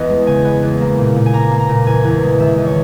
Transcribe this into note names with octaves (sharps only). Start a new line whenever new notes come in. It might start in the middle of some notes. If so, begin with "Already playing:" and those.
Already playing: E2 B3 D#5
G#3
C#3 G#5
B3
E2
A#3
A#2
A#2
G#5
A#3 A#5
A#3
A#5
A#2
E2 G#5
E2
G#3
D#3 E5
E2
C#5